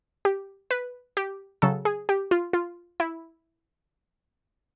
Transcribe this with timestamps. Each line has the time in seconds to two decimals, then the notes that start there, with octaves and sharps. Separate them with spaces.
0.25 G4
0.71 B4
1.17 G4
1.62 C#3 F#3 A4
1.85 G#4
2.09 G4
2.31 F4
2.53 F4
3.00 E4